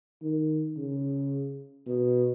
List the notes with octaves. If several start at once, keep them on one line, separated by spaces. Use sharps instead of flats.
D#3
C#3
B2